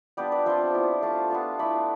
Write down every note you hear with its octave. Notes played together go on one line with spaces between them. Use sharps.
G3 B3 D4 F4 G4 B4
B4 D5
F3 C4 F4 C5 E5
B3 E4
A3 D4 F4 F5 A5
B3 D4 F4
A3 E4 B5 D6